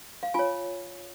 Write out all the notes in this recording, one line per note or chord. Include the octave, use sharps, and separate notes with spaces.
F5
F4 C#5 G#5